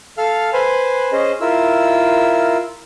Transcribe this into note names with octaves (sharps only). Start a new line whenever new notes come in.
A4 F5 F6
B4 C5 G#5
C#4 G#4 C5 D#5
E4 F4 A#4 E6